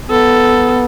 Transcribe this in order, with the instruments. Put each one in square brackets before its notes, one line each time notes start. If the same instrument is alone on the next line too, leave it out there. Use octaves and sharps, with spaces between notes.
[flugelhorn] B3 [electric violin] A4